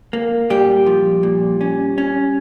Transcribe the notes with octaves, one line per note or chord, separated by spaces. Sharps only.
A#3
A#2 G3 G4
F3
A#2
C#4
C#4